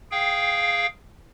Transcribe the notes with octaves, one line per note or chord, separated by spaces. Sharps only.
G#4 F5 G5